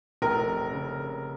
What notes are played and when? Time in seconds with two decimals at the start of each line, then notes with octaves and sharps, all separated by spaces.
0.22 F1 A#4
0.72 C#3